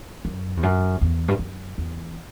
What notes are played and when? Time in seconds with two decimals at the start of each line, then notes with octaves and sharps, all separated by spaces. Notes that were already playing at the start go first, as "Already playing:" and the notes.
0.25 F#2
0.57 E2
0.63 F#2
1.01 E2
1.28 G2
1.39 F#2
1.78 E2